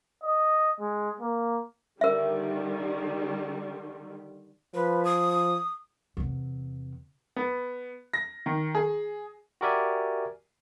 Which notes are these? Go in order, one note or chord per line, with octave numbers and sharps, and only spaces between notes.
D#5
G#3
A#3
D3 D#3 G3 A#4 E5
F3 B4
D#6
E2 C3
B3
A#6
D#3
G#4
F#4 G4 A#4 D5 E5 G#5